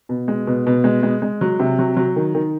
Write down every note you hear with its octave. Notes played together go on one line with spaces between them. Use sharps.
B2
G#3
B2
B2
G#3
G#3
G#3
F#3
C3
F#3
F#3
D#3
D#3